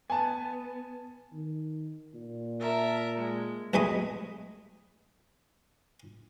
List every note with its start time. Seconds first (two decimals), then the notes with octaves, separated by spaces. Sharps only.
0.10 B3 G#5 A5
1.33 D#3
2.14 A#2
2.60 A#4 E5 A5
3.15 G#3
3.74 B1 G#3 A3 B5 D#6